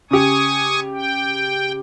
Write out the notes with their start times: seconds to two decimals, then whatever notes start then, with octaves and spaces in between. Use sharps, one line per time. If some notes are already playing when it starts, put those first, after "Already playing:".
0.11 C#3 G4 G#5 C#6 D#6
0.95 G5